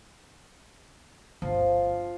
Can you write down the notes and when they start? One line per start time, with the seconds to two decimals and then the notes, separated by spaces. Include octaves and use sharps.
1.42 G1 D2 F3